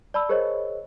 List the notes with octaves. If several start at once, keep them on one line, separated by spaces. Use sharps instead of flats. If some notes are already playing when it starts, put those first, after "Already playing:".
D5 A5 B5 E6
G#4 A#4 C5 C#5 D#5